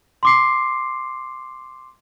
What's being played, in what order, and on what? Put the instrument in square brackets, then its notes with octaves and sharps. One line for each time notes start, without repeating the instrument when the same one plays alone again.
[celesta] C6 D6 C7